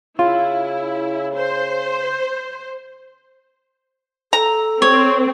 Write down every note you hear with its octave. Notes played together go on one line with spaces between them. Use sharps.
C#3 E4 F4
C5
A4 A#5
C4 C#5